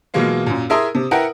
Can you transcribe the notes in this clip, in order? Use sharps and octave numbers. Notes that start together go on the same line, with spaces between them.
B2 E3 F#3 G#3 A#3 F4
F#2 A#2
E4 G#4 A#4 E5 C6 D#6
C3
E4 A#4 B4 F#5 G5